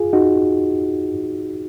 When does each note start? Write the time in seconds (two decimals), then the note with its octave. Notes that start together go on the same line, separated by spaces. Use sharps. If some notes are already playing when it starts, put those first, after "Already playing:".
Already playing: F4 G#4
0.13 D#4 F#4